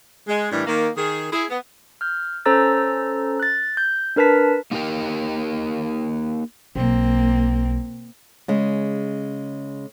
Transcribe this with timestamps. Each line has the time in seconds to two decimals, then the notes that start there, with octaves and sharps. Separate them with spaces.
0.28 G#3
0.52 A2 D#3 E3 G3 D4
0.66 D#3 A#3
0.98 D#3 G#4
1.33 E4 G#4
1.50 B3
2.01 F6 G6
2.46 C#4 A4 C5 A#5 E6 A6
3.40 F#6 A6
3.77 G6
4.16 D4 A#4 B4 A5 B6
4.71 A#3 D#4 G4 A#4 G5
6.76 B1 A#3 C4
8.48 C#3 G#3